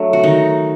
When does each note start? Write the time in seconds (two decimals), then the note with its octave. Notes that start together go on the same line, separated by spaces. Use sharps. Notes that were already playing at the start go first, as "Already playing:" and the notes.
Already playing: F#3 A3 D4
0.13 F#4
0.24 D#3 D#4